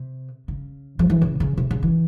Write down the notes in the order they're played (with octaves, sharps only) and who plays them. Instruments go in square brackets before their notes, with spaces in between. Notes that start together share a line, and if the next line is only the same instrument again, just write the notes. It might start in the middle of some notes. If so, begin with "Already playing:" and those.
Already playing: [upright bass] C3
C#3
F3
E3
C#3
C#3
C3
C#3
E3